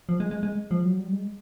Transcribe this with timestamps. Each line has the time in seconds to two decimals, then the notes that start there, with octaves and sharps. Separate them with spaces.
0.09 F3
0.20 G#3
0.31 G#3
0.43 G#3
0.71 F3
0.85 F#3
0.99 G3
1.12 G#3